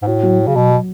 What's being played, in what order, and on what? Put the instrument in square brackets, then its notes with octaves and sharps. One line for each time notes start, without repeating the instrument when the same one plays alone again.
[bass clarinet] G#2
[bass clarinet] A2 [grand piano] F#4
[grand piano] F#3
F#3
[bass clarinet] C#3
[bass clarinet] B2 [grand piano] F#3
[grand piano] F#3